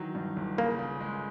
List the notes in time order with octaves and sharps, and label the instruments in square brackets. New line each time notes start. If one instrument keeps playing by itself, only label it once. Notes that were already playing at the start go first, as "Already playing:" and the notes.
Already playing: [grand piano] D#3 E3 F#3
G2
G1
[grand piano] C#3 [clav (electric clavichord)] A#3
[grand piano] C#3
G#3